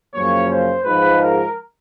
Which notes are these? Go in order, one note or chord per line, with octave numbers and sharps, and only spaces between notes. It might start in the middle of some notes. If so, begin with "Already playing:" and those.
F#2 C#3 F3 A#3 C#4 C#5
C5
G#2 F3 G#3 B4
A#4